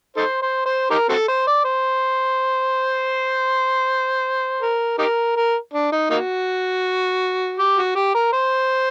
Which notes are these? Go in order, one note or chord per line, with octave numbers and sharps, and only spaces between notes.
D#4 A4 C5
C5
C5
D#4 G4 A#4
C4 F#4 A4
C5
D5
C5
A#4
D#4 G4 A#4
A#4
D4
D#4
A#3 D#4 F#4
G4
F#4
G4
A#4
C5